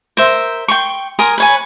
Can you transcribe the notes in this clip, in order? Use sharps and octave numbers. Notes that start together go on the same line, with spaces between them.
A#4 C5 E5
G5 C6 C#6
A#4 G#5 C6 D#6
B4 C#5 G#5